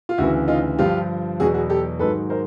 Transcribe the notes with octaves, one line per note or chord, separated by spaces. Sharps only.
F4
D2 C#3 E3 E4 F#4
D#4 F4
G2 D3 F3 F4 G4
E2 B2 F#3 F#4 G#4
F#4 G#4
G4 A4
G#2 D#3 F#3 A4 B4
A#4 C5